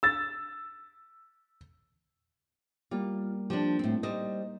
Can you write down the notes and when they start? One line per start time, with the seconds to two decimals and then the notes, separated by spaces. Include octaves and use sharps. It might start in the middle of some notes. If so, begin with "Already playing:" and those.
0.03 E6 A6
2.91 G3 A#3 F4
3.50 F3 D4 G4
3.79 A2 C4
4.03 G3 D#4 C5 D#5